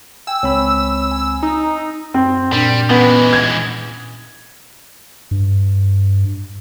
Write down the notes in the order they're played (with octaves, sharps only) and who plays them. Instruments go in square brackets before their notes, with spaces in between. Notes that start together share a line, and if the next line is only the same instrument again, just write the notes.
[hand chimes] G5 G#5 [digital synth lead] E6
[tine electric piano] C#2 C4 B5 [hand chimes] C#5
[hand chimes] G#5
[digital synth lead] D#4 [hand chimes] E6
[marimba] F#2 [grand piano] C4
[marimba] A#2 D4 [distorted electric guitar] G3
[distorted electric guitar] E3 G#3 [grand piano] B3 [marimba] C#4
[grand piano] G#6
[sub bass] G2